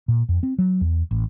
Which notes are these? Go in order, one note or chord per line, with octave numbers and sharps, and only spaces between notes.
A#2
F2
C4
F#3
E2
A1